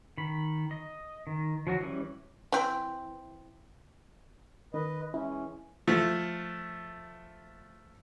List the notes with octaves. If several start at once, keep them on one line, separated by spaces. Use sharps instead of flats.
D#3 B5
D#5
D#3
F3 F#3 F#4
E3 G3 C#4
E3 C4
D#3 B4 D#5
E3 G#3 C#4 E4
F3 A3